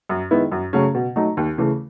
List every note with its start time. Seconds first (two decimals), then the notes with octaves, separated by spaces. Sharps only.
0.09 F#2
0.31 D#3 G#3 B3 E4
0.52 F#2
0.73 C#3 F#3 A3 C#4
0.95 B2
1.16 F#3 A3 D#4
1.37 D#2
1.58 C#3 E3 A3